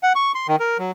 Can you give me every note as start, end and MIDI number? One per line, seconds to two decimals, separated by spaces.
0.03 0.13 78
0.15 0.32 85
0.35 0.47 84
0.48 0.56 51
0.60 0.78 70
0.79 0.91 54